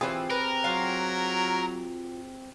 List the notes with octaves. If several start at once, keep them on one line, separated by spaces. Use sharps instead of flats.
E3 C4 E4 F4 G4 G#4
A#4 B4
F#3 F4 F#4 F5